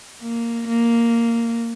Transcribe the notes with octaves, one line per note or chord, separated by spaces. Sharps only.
A#3
A#3